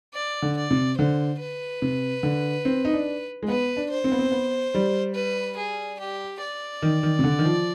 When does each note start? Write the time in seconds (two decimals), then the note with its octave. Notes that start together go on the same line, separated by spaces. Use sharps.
0.14 D5
0.42 D3
0.57 D5
0.71 C3
0.98 D3 C5
1.40 B4
1.82 C3
2.23 D3
2.65 C4
2.85 D#4
2.93 D4
3.43 G#3
3.48 B3 B4
3.77 D4
3.90 C5
4.04 C4
4.12 B3
4.19 C4
4.32 B3
4.75 G3
5.15 B4
5.57 G#4
5.99 G4
6.41 D5
6.82 D#3
7.03 D#3
7.19 C3
7.24 D3
7.39 D#3
7.45 F3